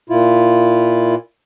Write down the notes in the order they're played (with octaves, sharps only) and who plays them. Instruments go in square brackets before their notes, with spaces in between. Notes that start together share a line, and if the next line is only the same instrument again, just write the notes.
[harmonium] A#2 E4 F4